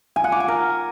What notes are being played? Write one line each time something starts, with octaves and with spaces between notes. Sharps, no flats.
G#5
F#5
D6
G#5
A#4